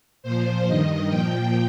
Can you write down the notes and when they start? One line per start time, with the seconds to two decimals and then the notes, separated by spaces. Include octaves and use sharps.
0.23 A#2 F3 C5
0.66 G2 D#3 D#5
1.09 A#2 F3 G5